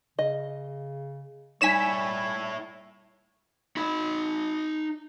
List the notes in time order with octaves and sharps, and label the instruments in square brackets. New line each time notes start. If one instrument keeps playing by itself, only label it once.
[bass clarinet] C#3 [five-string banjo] D#5
[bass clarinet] G3 [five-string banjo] D#4 [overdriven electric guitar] E4 C#5 [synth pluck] G#5 B6 E7
[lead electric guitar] D#4 B5